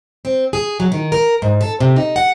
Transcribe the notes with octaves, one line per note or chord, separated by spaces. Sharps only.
C4
G#4
F#3
D#3
A#4
G#2
A4
C3
D#4
F#5